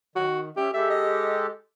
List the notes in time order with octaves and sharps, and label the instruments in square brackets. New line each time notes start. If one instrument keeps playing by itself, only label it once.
[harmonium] D#3 [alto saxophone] F#4
[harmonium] C#4 E5 [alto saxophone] G4
[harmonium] G#3 G4 A4 [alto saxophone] E5
[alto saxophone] D#5